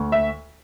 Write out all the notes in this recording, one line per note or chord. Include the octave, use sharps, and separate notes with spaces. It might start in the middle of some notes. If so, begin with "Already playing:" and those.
Already playing: D2
E5